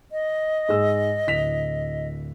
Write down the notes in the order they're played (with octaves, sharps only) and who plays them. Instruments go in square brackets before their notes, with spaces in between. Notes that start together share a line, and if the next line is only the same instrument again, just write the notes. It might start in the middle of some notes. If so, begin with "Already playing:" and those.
[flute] D#5
[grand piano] G#2 G#4 E6
D1 B6 F7